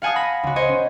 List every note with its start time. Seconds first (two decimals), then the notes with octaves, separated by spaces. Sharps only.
0.02 F5 F#5 G#5 A5 D#6
0.16 B5 A#6
0.43 C#2 F#4
0.56 C5 C#5 D#5
0.69 C#4